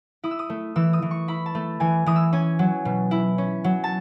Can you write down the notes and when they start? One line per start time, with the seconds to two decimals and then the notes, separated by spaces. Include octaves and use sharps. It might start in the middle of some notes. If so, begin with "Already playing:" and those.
0.24 E4 D#6
0.31 E6
0.39 D#6
0.49 A3
0.76 E3 E6
0.93 D#6
1.02 E3
1.11 C#6
1.28 E4 B5
1.46 A5
1.55 A3
1.80 E3 G#5
2.06 E3 D#6
2.16 E6
2.33 C#4 G#5
2.59 F#3
2.85 B2
3.11 E4
3.38 C#4
3.64 F#3
3.84 A5